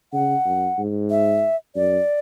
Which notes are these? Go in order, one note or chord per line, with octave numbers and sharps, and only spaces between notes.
C#3 F#5
F#2
G#2
E5
F#2 D5